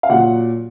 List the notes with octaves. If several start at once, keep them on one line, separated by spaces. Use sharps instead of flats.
F5
A#2 F#3 F#5